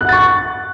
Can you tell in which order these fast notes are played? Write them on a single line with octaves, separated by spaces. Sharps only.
F#6 F#5 A6 C#6